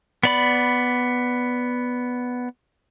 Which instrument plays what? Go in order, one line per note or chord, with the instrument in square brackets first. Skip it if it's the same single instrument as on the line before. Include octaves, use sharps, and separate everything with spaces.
[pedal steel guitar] B3 D5 B5